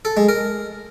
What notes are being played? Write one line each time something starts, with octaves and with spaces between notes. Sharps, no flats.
A4
G#3
A#4